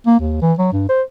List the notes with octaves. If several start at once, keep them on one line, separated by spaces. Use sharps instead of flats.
A#3
D#2
E3
F#3
G2
C5